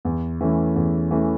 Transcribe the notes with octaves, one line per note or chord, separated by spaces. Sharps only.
E2
E3 A3 C#4
E2
E3 A3 C#4